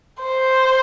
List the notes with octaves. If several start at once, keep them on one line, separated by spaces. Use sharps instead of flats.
C5